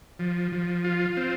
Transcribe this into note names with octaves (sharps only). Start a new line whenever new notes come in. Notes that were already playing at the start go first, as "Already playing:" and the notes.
F3
F3
F4
C4